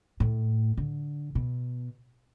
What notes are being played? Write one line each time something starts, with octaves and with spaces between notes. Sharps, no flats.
A2
D3
B2